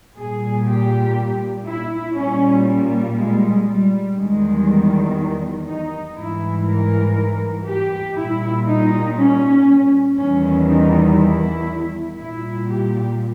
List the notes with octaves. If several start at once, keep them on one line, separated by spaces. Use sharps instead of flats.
A#2 G3 G#4
G4
E4
A#2 G3 C#4
A#3
G#3
G3
E2 D#3 G3 G#3
D#4
G#2 E3 G3 E4
A#4
G4
A#2 G3 E4
D#4
C#4
E2 D#3 G3 C#4
D#4
E4
A#2 G3 E4
G4